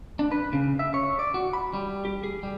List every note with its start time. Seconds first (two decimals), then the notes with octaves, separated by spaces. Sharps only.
0.19 D4
0.32 B4
0.53 C#3
0.79 E5
0.94 C#5
1.19 D5
1.34 F#4
1.53 B5
1.73 G3
2.05 G4
2.24 G#4
2.43 G3